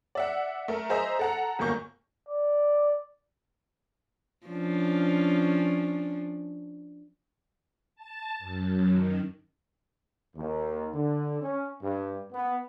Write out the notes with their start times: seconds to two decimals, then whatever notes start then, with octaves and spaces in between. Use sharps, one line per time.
0.15 D5 E5 F#5
0.68 A3 A#4
0.89 G#4 C5 D#5 E5 A#5
1.19 A4 F#5 A#5
1.59 G1 D2 A#3 C#6 G6
2.29 D5
4.47 F3 C#4 D4
7.96 A5
8.39 F#2
8.91 D#3
10.36 D#2
10.94 D3
11.42 C#4
11.82 G2
12.33 B3